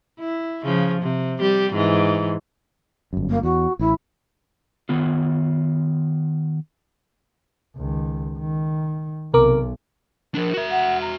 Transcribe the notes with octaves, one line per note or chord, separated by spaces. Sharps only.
E4
C#3 F3
C3
G3 G4
G#2 E3
G1 F#2
A#3
E2 F#4
A1 E4
D#3 B3 F4
C#2 D#3
D#3
B1 C3 A#4 D6
F3 D4 A#4
F#4 E5
F#5
A#5